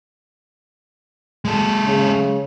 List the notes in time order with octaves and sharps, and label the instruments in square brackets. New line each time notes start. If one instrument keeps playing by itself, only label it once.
[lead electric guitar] G#3 A4
[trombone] C#3